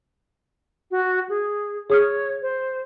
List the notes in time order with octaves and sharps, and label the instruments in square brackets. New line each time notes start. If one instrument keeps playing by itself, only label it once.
[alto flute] F#4
G#4
[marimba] G#4 D#6 F6 [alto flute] C#5
[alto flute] C5